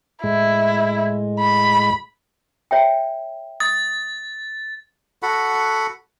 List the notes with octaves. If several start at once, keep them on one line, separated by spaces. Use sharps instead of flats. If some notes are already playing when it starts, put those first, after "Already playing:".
A2 G#3 E4
B5
C#5 E5 G5
D#6 A6
F#4 A4 F#5 B5